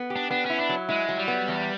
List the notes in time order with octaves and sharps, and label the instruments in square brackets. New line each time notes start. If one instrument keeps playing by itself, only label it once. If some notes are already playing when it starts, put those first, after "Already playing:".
Already playing: [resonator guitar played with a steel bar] B3
G4
[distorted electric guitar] D4
[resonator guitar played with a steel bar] B3 [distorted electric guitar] D4
[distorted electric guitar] C#4 [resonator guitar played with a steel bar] E4
[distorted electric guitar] D4
[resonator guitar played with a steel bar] F#3
[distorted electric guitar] G#3 [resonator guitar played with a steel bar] E4
[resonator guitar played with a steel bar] F#3
[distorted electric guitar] G3
[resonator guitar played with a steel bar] B3
E2